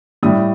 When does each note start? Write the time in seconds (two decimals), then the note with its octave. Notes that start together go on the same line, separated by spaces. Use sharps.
0.23 A2 G3 D#6